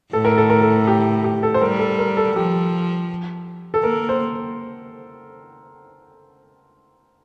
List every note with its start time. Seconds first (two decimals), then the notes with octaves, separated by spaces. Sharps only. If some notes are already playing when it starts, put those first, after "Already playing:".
0.13 A2 A4
0.25 A#4
0.37 A4
0.50 A#4
0.61 A4
0.87 G4
1.24 G4
1.43 A4
1.54 C5
1.61 G3 A#4
1.79 A4
1.98 A#4
2.17 A4
2.36 F3 G4
3.74 A4
3.83 A#3 A#4
4.09 C5